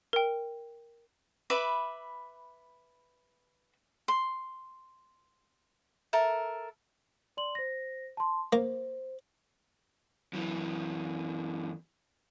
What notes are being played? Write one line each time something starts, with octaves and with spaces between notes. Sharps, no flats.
A#4 G5
B4 E5 B5 D6
C6
A4 A#4 E5
D5 C6 F#7
C5 A#6
A5 C6
A#3 C5
F#2 E3